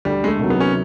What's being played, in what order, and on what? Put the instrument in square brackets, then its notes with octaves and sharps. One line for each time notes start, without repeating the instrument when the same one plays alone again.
[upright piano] D2 [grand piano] G3
[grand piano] G#3
A3
[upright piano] C3 D#3 F#3
[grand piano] B3
C#4